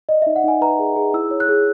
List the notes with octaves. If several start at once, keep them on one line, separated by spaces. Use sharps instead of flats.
D5 D#5
E5
D#4
F#5
D#4 G#5
B4 A#5
G#4
G#4
E4 E6
C#5
F#6
G#4